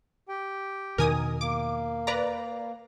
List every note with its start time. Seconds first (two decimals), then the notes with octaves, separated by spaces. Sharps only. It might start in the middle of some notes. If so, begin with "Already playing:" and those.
0.29 G4 G5
0.98 E2 B2 D#3 A#4 G#5 D#6
1.41 A#3 D6
2.07 B4 D5 A#5